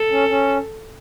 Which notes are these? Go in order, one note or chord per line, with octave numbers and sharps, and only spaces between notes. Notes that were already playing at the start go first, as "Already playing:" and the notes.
Already playing: A4
C#4
C#4